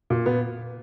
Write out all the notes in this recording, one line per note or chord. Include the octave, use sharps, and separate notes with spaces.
A#2
A#2 B3